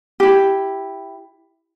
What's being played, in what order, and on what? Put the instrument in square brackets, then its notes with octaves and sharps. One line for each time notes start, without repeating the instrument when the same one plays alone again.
[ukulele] E4 G4